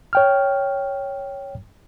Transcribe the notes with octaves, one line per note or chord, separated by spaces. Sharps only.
C#5 G5 F6